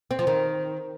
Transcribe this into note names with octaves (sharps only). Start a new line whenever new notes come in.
C4
F3
D#3